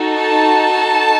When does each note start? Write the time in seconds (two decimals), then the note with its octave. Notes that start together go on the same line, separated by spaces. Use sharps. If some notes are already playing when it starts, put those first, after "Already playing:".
Already playing: D#4 F#4 A4
0.14 A5